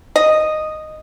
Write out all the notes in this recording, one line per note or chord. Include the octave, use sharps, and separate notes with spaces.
D#5